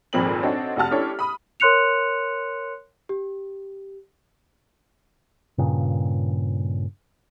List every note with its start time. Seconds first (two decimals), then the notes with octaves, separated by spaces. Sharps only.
0.13 G#1 F2 A#2 C4 B5 F#7
0.43 C4 D4 D#4 F#4 A4 C#5
0.76 F1 F#4 F#5 A5 F6
0.91 C#4 D4 E4 G4 A4 C#5
1.19 B5 D#6
1.60 A#4 C#5 C6 F#6 C#7 F7
3.09 G4
5.58 G2 A#2 C#3